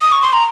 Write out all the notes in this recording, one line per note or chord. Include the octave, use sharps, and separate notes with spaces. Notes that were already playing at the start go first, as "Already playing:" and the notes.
D#6
C#6
C6
A#5